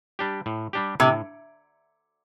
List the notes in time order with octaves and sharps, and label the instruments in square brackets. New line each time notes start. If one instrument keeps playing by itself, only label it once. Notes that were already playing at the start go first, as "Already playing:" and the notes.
[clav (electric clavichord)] G3 D4 G4
A2
G3 D4 G4
[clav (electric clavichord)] A2 [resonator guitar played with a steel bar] C3